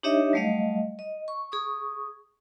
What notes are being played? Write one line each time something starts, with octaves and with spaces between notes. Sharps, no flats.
D4 D#4 G4 C#5 D#5 E5
F#3 G3 A3 D#5 F5
D#5
C#6
G#4 C#6 D#6